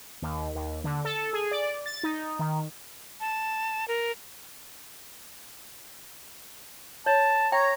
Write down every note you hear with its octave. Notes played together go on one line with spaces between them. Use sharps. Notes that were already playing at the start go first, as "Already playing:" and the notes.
D#2
D#2
D3
A4
G#4
D5
A6
D#4
D#3
A5
A#4
C#5 A5
C#5 G5 A#5